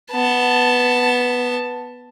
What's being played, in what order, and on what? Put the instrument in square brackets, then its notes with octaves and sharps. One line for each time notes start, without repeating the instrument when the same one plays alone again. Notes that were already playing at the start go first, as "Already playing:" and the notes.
[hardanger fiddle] B3 A5